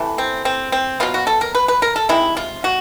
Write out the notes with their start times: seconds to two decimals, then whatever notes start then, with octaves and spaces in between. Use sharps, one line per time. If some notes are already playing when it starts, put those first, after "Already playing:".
Already playing: C3 E3 A3
0.18 C4
0.45 C4
0.72 C4
1.00 B2 F#3 B3 F4
1.14 F#4
1.27 A4
1.41 A#4
1.55 B4
1.68 B4
1.82 A#4
1.96 A4
2.09 C3 D#3 G#3 E4
2.37 F4
2.64 F#4